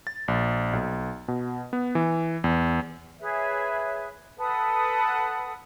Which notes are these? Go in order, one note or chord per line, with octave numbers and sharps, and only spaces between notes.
A6
A#1
B1
B2
B3
E3
E2
G#4 B4 C#5 E5
A4 B4 F#5 D#6